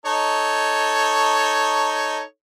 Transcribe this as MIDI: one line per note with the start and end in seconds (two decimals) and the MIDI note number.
0.06 2.21 63
0.06 2.21 69
0.06 2.21 73